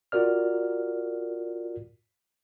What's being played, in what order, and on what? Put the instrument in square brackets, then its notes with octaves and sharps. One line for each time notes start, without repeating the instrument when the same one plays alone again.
[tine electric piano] F4 F#4 A#4 D5 F6